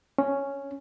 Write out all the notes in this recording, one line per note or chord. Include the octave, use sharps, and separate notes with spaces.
C#4